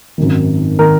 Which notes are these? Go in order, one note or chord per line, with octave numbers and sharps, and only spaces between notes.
G#1 F#2 D#3
D#3 A#4